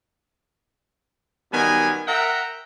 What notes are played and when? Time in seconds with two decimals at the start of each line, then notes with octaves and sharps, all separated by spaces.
1.51 F#2 D#3 G3 B3 G#5
2.07 A#4 E5 F#5 G5 A#5